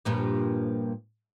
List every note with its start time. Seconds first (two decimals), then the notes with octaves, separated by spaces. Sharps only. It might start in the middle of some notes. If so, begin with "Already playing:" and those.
0.05 G2 A#2 F3